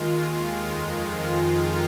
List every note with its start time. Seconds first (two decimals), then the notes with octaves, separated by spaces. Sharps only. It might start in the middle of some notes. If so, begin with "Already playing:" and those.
Already playing: D#2 D#3 G#3 F4
0.61 F2 D#3 G#3 F4
0.90 F4
1.20 F4
1.50 D#4